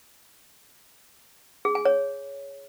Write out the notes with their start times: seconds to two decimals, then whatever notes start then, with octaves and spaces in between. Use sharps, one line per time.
1.65 G#4
1.75 G#5
1.85 C#5